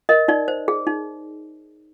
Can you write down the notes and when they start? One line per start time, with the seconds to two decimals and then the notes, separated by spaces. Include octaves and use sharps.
0.09 A#4 D#5
0.28 D#4 D5
0.48 C5
0.68 G#4
0.87 D#4